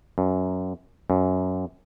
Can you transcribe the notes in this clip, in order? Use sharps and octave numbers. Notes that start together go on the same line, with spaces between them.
F#2
F#2